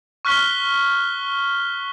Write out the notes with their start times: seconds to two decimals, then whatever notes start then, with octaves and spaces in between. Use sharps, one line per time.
0.25 C#6 F6 F#6 B6 G7